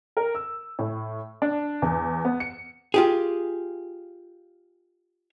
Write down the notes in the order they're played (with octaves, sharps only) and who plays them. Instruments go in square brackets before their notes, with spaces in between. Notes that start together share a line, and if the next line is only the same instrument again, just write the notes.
[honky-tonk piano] A#4
E6
A2
D4
E2
B3
C#7
[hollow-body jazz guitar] F4 G4 G#4